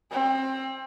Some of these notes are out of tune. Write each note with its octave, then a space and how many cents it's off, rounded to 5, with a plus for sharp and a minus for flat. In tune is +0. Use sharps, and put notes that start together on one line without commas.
C4 +25